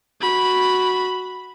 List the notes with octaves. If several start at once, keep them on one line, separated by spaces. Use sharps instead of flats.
F#4 B5